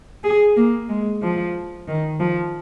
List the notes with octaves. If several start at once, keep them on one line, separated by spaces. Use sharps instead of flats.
G#4
A#3
G#3
F3
D#3
F3